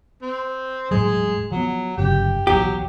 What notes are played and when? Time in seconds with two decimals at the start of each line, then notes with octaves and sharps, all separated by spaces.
0.22 C4
0.91 E1 A2 F#3 G#3
1.52 F3 F#3 B3
1.98 G1 F#2 C#3 G4
2.47 B1 E2 A2 F#3 G4